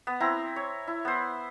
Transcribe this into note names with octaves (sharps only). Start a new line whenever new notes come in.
B3
C4 E4 A#5
C#5
E4
B3 C5